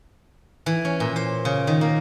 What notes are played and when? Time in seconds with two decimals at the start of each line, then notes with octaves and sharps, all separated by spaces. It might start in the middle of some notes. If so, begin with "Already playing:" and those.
0.66 E3
0.85 C#4
1.00 A#2
1.16 C5
1.45 C#3
1.67 D#3
1.81 A#3